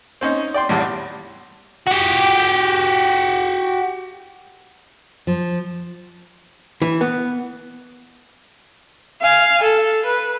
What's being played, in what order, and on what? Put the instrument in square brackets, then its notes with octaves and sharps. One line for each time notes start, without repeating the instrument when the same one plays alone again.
[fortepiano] C4 C#4 D#4 C5
D5 G5 C6
G#1 E2 A2 G3
[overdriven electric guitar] F#4 G4
[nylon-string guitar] F3
[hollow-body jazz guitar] E3
B3
[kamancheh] F5 G#5
A4
B4